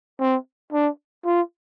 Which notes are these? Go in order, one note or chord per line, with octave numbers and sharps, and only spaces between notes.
C4
D4
F4